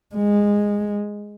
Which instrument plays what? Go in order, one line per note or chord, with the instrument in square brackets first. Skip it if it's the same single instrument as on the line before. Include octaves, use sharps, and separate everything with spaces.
[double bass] G#3